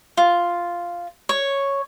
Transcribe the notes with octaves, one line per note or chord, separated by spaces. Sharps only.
F4
C#5